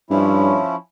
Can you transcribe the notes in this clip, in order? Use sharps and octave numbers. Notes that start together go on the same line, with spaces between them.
G2 F3 C#4 E4